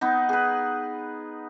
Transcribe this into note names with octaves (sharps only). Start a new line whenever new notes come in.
B3 D#4
G#4 B4